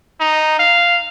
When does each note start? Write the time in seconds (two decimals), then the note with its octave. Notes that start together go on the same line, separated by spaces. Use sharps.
0.20 D#4
0.59 F5